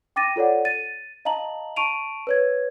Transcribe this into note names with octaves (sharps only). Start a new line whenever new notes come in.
G5 D6 A6 A#6 D#7
F4 A4 C#5 D5 F#5
A6 D#7
D#5 F5 A5 A#5 F#7
A5 C#6 D7 D#7 F7
B4 C#5 G#6